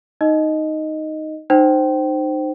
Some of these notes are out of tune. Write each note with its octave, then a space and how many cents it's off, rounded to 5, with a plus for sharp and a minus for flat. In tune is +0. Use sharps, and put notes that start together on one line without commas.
D#4 +0 D#5 +0
D#4 -30 C5 +0 G5 -25